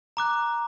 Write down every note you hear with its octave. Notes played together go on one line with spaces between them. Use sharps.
A#5 D6 F#6